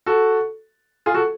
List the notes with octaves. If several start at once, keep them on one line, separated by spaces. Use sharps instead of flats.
F#4 A4
F4 G#4
F#4 A4